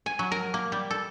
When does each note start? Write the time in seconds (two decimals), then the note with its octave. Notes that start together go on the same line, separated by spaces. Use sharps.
0.06 G#5
0.19 F#3
0.32 A#4
0.54 A#3
0.72 G3
0.91 A4